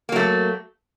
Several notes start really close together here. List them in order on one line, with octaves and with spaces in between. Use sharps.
A#3 F#3 A3